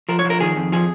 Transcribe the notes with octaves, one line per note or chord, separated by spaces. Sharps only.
F3 A#4
C#5
F3
A#4
D#3 G#4
F2
F3 G#4